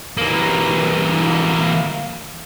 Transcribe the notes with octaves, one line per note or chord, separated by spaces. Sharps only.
E3 A#3